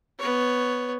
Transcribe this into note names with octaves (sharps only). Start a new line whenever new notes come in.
B3 C#5